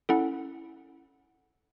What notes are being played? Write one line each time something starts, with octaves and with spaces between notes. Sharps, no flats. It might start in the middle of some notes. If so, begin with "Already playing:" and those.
C#4 E4 A4 F#5